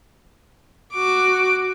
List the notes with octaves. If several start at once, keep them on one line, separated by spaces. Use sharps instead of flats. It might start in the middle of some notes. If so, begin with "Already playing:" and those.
F#4 D6